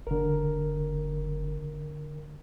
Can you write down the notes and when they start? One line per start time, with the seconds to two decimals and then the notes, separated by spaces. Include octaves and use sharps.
0.07 F#1 D3 A#4